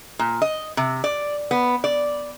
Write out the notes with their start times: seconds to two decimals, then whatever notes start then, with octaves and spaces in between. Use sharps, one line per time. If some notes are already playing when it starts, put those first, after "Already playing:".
0.19 A#2
0.42 D#5
0.77 C3
1.04 D5
1.51 B3
1.84 D5